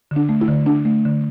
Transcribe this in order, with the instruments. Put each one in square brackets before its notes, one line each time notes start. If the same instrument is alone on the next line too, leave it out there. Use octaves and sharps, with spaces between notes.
[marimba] D3
D4
A3
E4
D3
D4
A3
D3